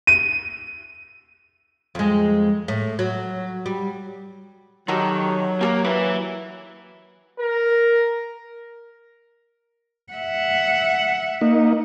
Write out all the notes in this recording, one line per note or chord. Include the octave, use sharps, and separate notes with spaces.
D#7
F2 G#3
A2
F#3
G3
D#3 F#3 G4 A4 A#4
A#3 G4 A4 A#4
E4 B4 D6
A#4
E5 F#5
A#3 D#4